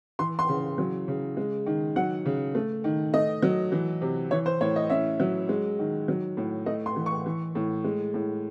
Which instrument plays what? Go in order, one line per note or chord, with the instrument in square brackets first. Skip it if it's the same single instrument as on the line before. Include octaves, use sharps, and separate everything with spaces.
[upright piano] E3 C6
C6
C#3
F#3
C#3
G#3
D#3
F#3 F#5
C#3
A3
D#3
A3 D#5
F#3
E3
C3
E3 C#5
C5
A2 C#5
D#5
C#4 E5
F#3
G#3
D#3
F#3
A2
A3 D#5
C6
E3
C#6
E3
A2
G#3
A2